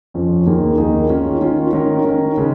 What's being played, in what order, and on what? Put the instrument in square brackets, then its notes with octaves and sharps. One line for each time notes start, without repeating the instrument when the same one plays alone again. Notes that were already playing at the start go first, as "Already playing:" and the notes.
[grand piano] F2 F3 C#4
D#2 D#3 A#3 D#4 G#4
D#2 D#3 A#3 D#4 G#4
D#3 C#4 F4
D#3 C#4 F4
D#3 C#4 A#4
D#3 C#4 A#4
C#3 G#3